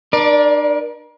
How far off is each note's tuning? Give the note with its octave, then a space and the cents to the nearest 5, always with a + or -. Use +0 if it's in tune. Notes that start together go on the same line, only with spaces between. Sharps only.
D4 +45 A#4 +40 D5 +0